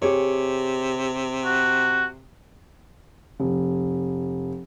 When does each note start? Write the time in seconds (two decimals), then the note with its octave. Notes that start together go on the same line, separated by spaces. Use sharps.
0.02 C3 G4 G#4 C#5
1.45 F#4
3.40 F1